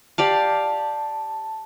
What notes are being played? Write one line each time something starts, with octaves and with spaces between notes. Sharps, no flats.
G4 D5 F5 A5